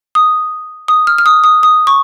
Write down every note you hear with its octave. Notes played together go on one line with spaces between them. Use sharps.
D#6
D#6
F6
F6
D#6
D#6
D#6
C#6